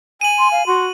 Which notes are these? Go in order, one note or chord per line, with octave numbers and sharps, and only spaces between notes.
G#5 D#7 F#7
C6
F5
F#4 C6